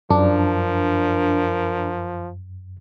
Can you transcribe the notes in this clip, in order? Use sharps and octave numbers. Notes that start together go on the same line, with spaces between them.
F#2 F3 D4 A#4